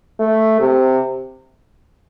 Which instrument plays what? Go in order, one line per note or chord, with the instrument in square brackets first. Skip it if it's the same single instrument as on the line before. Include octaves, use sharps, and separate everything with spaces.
[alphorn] A3
C3